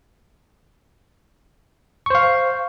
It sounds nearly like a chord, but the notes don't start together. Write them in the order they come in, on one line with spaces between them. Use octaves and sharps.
C#6 C5 F5